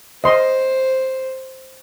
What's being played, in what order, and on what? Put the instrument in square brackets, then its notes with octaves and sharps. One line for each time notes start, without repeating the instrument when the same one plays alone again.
[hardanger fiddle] C5 [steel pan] D#5 C6